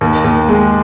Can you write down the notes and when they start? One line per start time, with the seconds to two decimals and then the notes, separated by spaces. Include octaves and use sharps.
0.01 D#2
0.24 D#2
0.49 G#3